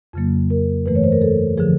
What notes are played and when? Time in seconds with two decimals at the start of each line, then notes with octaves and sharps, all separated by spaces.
0.13 F2 C#3 F#3 A#3
0.50 A#4
0.86 G2 E3 A3 B4
0.95 C#5
1.04 C5
1.12 A#4
1.22 A4
1.57 D3 F3 G#4